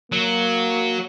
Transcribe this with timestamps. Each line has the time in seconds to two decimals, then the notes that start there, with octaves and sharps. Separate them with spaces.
0.12 F#3 A#3